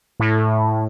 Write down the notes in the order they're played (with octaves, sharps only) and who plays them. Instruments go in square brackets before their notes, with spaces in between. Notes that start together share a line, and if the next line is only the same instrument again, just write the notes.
[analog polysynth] A2